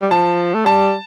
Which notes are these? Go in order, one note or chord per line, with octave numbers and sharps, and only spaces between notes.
G3
F3 A5
A3
G3 A5